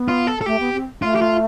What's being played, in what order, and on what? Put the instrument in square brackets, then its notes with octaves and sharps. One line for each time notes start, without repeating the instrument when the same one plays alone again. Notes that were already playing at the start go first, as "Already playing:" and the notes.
Already playing: [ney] B3
[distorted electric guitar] F4
A4
A4
[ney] A3 [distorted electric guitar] G4
[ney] B3
C4
[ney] A3 [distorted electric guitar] F4
[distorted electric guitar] G4
F4